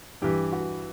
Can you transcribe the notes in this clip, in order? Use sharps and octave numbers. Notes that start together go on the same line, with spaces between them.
G2 E3 G4
F#4